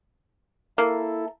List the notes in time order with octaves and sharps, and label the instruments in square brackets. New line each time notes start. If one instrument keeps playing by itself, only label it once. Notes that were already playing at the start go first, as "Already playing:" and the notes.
[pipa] A#3 [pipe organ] E4 A4